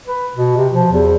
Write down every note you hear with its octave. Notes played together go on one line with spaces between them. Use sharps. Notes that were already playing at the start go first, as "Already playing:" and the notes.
B4
B2
C3
F3
E2